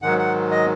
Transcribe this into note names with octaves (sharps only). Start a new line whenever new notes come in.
G#2 D#3 F#3 F#5
F#5
D#5